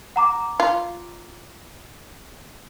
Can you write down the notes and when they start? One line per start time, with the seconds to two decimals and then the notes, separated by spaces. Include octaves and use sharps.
0.16 F#5 A#5 D6
0.60 F4